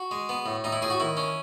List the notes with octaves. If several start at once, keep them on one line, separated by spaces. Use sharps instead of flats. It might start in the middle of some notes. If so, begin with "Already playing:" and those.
Already playing: F#4
G#3
B3
A2
A2 D#4
E4
A2 G#4
F#4
D#3 E4
C#4